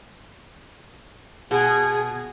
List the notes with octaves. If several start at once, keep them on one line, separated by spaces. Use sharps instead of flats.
B2 G#4